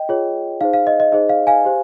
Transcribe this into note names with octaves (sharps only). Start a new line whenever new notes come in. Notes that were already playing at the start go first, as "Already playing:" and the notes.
Already playing: D#5 G5
F4 G#4 C#5
D#4 G#4 C5 F5
F5
D#5
D#5
D#4 G#4 C5 D#5
F5
F5 G#5
G4 C5